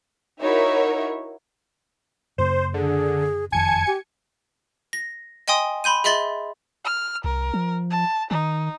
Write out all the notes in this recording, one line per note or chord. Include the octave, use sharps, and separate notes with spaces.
D#4 E4 F#4 A#4 C#5 E5
F#2 C#3 A#3 C5
D3 G#4
F#1 F2 D#3 G#5 A5 G#6 C#7
G4
A#6
D#5 G5 G#5 C6 D#6
B5 C6 G6 D#7
G#4 D#5 E5 C6 A6 F#7
F6
C2 A#4
F3
A5
D#3 D#4